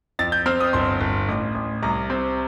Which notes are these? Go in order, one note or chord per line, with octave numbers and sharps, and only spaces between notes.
F2 A6
G6
C4 F6
D#6
G1 C6
G1
A1
A1
C2 A#5
C4